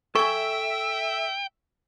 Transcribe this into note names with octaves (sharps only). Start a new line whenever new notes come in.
A4 E5 G5 G#5 C#6